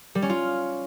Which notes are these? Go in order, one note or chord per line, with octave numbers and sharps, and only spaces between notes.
G3
C#4
F4